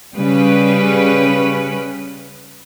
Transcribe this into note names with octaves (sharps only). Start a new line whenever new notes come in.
C#3 G3 C#4 B4